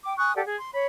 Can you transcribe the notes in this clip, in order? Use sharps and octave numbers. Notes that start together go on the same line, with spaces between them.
G5 D6
G#5 C#6 D#6 F#6
G4 A4 D5 F#5
G#4
C6
C#5 B5